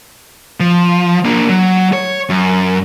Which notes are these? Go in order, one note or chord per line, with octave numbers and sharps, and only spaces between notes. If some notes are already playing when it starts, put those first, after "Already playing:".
F3
A#3 D4
F#3
C#5
F#2